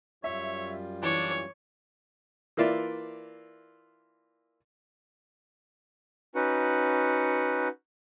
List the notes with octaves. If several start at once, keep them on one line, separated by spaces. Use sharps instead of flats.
F#2 G3 F4 C#5 E5
E3 D4 C#5
E3 A#3 F4 D5 E5
C#4 D#4 F#4 B4 F#5